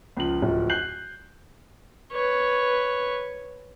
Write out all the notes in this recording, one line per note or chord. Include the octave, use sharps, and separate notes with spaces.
C#2 F3 F#7
D1 F3
F#6 G6 C7 F#7
B4 C#5